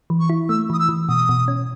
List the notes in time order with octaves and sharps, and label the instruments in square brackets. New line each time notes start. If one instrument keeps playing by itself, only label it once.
[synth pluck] E3
[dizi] C#6
[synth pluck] E4
[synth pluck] A3 [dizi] E6
[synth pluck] E3 [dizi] D#6
[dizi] E6
[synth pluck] E3
[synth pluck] B2 [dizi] D#6
[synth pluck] B2
C#4